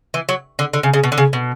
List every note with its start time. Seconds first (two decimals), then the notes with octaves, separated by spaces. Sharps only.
0.14 E3
0.29 F#3
0.59 D3
0.73 D3
0.83 C#3
0.93 C#3
1.03 B2
1.12 D3
1.18 C#3
1.33 B2